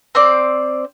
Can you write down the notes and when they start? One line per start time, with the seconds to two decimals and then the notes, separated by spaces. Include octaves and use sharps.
0.15 C4 C5 D5